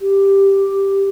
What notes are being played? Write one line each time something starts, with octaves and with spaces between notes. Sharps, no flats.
G4